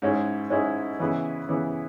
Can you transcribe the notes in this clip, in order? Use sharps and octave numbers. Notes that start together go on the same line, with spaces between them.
G#2 G#3 C#4 E4
G#2 G#3 C#4 E4
C#3 E3 B3 E4
C#3 E3 B3 E4